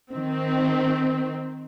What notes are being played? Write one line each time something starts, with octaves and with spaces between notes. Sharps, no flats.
D#3 C4